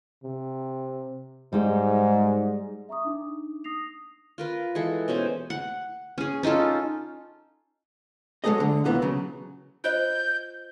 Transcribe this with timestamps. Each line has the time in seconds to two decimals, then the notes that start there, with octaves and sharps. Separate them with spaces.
0.24 C3
1.53 G#2 G3 G#3 D#4
2.89 E5 A#5 C#6 D#6
3.05 D4 D#4 D6
3.64 D#6 A#6 C7 F7
4.38 F4 A#4 B4
4.75 E3 G#3 G#4 A4
5.08 B2 C#4 C5 G#5
5.50 F#5
6.18 C#4 G#4
6.43 C#4 D#4 F4 A4
8.44 F#3 G#3 C4 G#4 A4 D#5
8.58 D2 D3
8.85 C#2 C3 E3 A#3 B3
9.02 C#3 F#3
9.84 F4 C5 D#5 G6